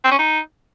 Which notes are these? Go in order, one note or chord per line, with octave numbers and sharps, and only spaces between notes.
C4
C#4
D#4